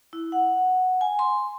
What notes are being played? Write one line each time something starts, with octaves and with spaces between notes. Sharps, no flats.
E4
F#5
G#5
C6